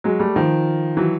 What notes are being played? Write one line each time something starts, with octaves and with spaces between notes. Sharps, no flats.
F#3 G#3
G3 A3
D#3 F3
E3 F#3